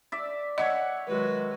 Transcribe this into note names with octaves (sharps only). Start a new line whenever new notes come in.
D5 E5
C#5 D#5 E5 F#5 C#6
D#3 F#3 G#3 F#4 B4